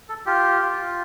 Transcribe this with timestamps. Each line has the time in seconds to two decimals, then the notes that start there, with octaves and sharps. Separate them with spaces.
0.09 A4
0.26 F4 G4
0.62 F4